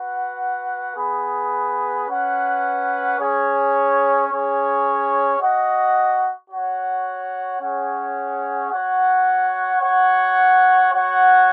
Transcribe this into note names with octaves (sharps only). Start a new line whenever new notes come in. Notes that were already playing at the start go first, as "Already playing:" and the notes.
Already playing: F#4 B4 F#5
B3 G#4 B4
C#4 B4 F#5
C#4 G#4 C#5
C#4 G#4 C#5
F#4 D#5 F#5
F#4 C#5 F#5
C#4 G#4 C#5 F#5
F#4 C#5 F#5
F#4 C#5 F#5
F#4 C#5 F#5